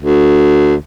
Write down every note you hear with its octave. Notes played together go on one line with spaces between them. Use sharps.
D2